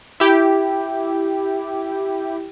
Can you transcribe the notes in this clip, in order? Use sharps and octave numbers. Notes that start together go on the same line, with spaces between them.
E4 G4